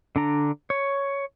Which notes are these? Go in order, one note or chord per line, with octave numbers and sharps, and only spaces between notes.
D3 D4 A#5
C#5